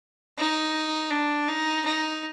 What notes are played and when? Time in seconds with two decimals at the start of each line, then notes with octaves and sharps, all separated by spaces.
0.38 D#4
1.11 D4
1.48 D#4
1.85 D#4